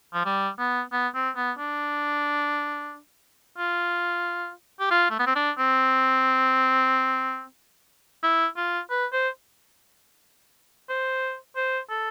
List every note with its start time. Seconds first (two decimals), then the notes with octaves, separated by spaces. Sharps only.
0.14 F3
0.26 G3
0.59 B3
0.92 B3
1.14 C4
1.36 B3
1.59 D4
3.58 F4
4.80 G4
4.91 F4
5.11 A3
5.19 B3
5.26 C4
5.36 D4
5.58 C4
8.23 E4
8.56 F4
8.90 B4
9.13 C5
10.89 C5
11.56 C5
11.90 A4